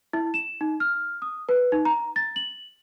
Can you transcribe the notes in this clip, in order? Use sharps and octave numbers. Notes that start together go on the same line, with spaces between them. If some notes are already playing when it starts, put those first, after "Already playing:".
E4
E7
D#4
F6
D#6
B4
D#4
A#5
A6
F#7